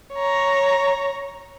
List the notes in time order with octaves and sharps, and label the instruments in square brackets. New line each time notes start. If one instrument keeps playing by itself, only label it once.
[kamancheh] C#5 A#5